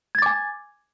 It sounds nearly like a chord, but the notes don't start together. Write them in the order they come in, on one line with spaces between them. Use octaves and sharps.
G#6 A6 D6 G#5